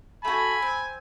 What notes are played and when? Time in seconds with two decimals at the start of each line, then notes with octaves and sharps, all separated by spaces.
0.25 A3 F#4 G#5 B5
0.62 C4